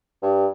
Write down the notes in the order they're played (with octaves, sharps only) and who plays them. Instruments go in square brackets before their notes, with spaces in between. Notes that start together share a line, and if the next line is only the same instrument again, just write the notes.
[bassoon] G2